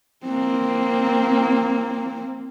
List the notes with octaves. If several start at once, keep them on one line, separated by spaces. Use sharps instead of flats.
A#3 C4